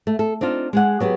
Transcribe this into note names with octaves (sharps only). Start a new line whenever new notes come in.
A3
A4
C4 D4 D#4 F4
G#3 G#4 F#5
F#3 B3 G4 G#4